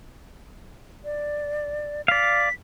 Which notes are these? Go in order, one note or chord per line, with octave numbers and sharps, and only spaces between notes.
D5
D5 F5 B6